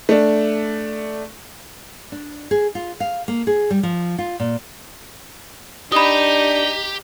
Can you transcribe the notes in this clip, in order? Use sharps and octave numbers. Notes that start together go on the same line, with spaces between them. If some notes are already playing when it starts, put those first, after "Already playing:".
A3 D4
D4
G#4
F4
F5
A#3
G#4
G3
F3
F4
A#2
D4 D#4 G4 B5 D#6